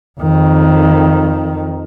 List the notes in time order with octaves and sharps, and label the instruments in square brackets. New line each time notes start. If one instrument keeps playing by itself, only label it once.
[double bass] F2 D#3